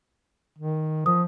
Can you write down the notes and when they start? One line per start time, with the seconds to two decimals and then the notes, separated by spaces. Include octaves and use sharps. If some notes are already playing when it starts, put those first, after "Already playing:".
0.59 D#3
1.06 F3 D#6